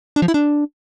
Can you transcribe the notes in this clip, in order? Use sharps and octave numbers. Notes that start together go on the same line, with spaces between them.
D4
F3
E4
D4